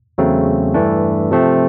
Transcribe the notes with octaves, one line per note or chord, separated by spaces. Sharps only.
E2 C#3 F#3 A3 C4
G2 E3 A3 D4
C3 F3 A3 C4